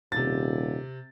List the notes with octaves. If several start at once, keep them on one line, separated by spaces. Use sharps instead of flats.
D#1 C3 A6